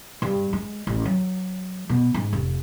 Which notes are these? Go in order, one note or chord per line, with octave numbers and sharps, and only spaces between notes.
G2
G#3
A1
F#3
B2
G#2
F1